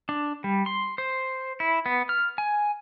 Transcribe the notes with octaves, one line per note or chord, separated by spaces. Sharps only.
D4
G3
C6
C5
E4
B3
F6
G#5